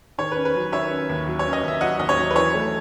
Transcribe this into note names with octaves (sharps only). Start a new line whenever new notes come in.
D#3 C#5
B4
C#4
B4
F#3
D#3 C#5 E5
C#4
D#2
F#3
C#5
C#4
D#5
D#2 E5
F#3 D#5 F#5
D#2 D#5
C#5
F#3
B4
E3 C#5
A3